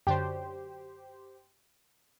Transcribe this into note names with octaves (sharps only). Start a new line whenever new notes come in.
F#2 D3 G4 C5